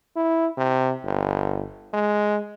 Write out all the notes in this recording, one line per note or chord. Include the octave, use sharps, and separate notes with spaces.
E4
C3
G1
G#3